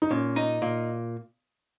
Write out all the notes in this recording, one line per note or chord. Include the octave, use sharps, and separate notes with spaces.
D#4
A#2 C#4
D#4
A#2